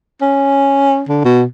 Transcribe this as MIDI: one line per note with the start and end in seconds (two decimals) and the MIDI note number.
0.21 1.03 61
1.09 1.20 50
1.25 1.44 47